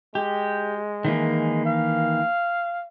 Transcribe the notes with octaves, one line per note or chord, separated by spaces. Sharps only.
G#3 G4
D#3 E3 A#3
F5